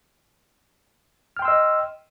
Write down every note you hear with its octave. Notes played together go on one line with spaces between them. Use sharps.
D#5 G5 C6 E6 F6